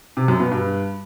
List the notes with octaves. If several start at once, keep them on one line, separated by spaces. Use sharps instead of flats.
C3
F#2
B2
G2